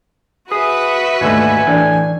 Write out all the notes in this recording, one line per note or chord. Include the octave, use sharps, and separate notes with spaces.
F#4 G#4 B4 E5 D#6
D#2 G#2 D3 A3 G#5
A2 E3 D4 D5